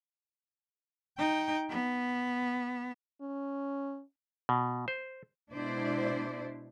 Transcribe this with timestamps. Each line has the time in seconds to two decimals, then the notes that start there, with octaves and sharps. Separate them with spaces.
1.18 D#4 G5
1.69 B3
3.21 C#4
4.49 B2
4.88 C5
5.52 B2 G#3 D4 E4 C5 D5